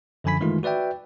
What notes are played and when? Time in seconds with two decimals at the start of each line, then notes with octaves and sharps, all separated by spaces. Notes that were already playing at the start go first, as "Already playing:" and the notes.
0.24 F#2 D3 F3 G#5 B5 B6
0.41 D#3 E3 G#3 A3 D#4 F4
0.63 F#4 B4 D5 E5 G5